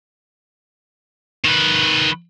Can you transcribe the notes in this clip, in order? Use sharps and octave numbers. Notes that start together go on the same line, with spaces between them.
D#3 B4